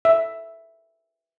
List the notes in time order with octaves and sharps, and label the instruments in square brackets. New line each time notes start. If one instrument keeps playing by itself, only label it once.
[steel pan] E5